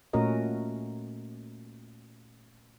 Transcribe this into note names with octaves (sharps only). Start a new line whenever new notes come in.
A#2 A3 C#4 F#4 A#4 D#5